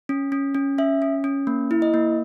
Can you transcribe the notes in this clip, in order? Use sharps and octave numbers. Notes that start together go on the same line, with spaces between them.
C#4
C#4
C#4
C#4 E5
C#4
C#4
A#3
E4
D#5
A#3